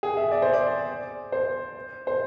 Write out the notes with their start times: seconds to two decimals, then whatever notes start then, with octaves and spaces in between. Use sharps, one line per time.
0.03 G#4
0.17 E5
0.31 D5
0.42 C5
0.53 D5
1.32 C5
2.07 C5